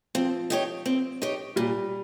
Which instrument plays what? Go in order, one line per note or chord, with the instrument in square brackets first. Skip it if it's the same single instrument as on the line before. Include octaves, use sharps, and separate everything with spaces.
[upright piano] F3 [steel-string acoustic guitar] C4
[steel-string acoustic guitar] D#4 G4 C#5
C4
D#4 G4 C#5
[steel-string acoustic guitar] A#2 [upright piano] G3